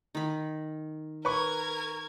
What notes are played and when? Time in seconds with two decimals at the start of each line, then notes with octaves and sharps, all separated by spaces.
0.15 D#3 B5
1.25 A#4 B4 C#6 G#6